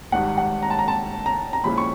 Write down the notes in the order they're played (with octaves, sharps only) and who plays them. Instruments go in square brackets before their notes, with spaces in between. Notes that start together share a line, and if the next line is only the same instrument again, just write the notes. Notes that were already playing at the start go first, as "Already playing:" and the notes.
[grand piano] G#1 G#2 D#3 G3 [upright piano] F#5
[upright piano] F#5
A#5
A5
A#5
A5
A#5
A#5
[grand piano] A#2 F3 G#3 C#4 E4 [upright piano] B5
[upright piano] C#6